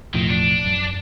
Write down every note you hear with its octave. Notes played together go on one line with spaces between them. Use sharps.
E1 A2 D#3 F3
D4
F#2